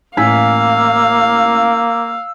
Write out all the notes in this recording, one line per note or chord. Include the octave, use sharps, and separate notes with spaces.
A1 A#3 F5 G#5 E6 B6